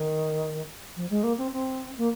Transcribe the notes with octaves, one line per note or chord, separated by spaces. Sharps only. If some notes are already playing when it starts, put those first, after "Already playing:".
Already playing: D#3
F3
G#3
A#3
C4
C4
A#3